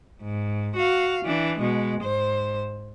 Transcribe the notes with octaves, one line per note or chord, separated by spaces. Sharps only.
G#2
F#4 F5
E3 D4
B2 G#3
G#2 C5